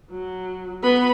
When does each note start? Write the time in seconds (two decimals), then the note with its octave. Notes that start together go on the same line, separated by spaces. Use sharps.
0.11 F#3
0.83 B3 B5